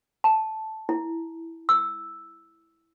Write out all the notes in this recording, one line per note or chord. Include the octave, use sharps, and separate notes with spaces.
A5
E4
E6